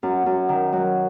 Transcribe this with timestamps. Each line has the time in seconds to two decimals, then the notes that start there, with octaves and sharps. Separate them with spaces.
0.03 F#2
0.26 F#2
0.49 D#3
0.73 F#3